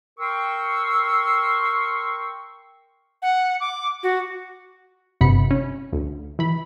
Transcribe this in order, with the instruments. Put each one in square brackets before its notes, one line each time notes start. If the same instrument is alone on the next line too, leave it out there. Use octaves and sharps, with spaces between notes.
[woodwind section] A#4 G5 C6 C#6 E6
[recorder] F#5
D6
F#4
[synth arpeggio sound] G1 G2 C3 B3 B5 C#7
C#4
D2
E3 B5